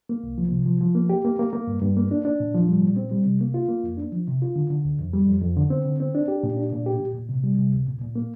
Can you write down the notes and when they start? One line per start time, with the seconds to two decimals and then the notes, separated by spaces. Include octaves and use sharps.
0.09 A#3
0.23 C2
0.38 F3
0.52 C3
0.66 F3
0.81 F3
0.95 A#3
1.10 G4
1.25 A#3
1.39 A#3
1.53 A#3
1.67 G2
1.82 G2
1.97 A#3
2.11 D4
2.25 D4
2.40 A#2
2.54 F3
2.68 G3
2.82 A#2
2.97 C4
3.11 G3
3.26 C3
3.41 A#3
3.54 F4
3.69 A#3
3.84 F2
3.97 D4
4.12 F3
4.27 C3
4.42 F4
4.56 D3
4.70 D3
4.85 D2
4.99 F2
5.13 G3
5.27 F2
5.42 F2
5.56 D3
5.70 C4
5.85 D3
6.00 C4
6.14 D4
6.28 G4
6.43 A#2
6.57 D4
6.72 A#2
6.86 G4
7.00 A#2
7.15 A#2
7.29 C3
7.44 G3
7.58 C3
7.73 D2
7.87 A#2
8.01 A#2
8.16 A#3